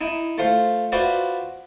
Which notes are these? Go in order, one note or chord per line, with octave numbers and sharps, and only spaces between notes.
D#4 E4
A3 F4 C5 F5
F4 F#4 B4 C5 D5 E5